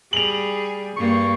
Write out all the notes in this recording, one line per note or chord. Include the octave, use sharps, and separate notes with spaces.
G3 G#4 F7 F#7
G2 A#3 C#6